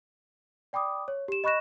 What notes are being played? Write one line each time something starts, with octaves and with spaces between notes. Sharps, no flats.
D5 G5 B5 D6 D#6
C#5
G4 E7
D#5 B5 C#6 F#6 A#6 E7